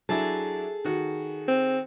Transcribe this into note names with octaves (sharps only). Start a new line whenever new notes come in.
F#3 D4 E4 G#4 A4
D#3 F#4
C4